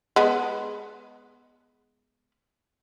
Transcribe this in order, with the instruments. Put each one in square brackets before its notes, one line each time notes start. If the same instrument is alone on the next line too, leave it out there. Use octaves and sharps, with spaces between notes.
[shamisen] G#3 B3